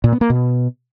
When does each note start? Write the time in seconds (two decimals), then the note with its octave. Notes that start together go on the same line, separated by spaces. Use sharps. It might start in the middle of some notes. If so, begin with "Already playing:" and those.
0.04 A#2
0.12 B3
0.21 A#3
0.30 B2